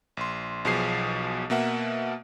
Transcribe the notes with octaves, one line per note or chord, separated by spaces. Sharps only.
A#1 C6
B1 B2 F3 G#4 C7
B2 A#3 E5 F#5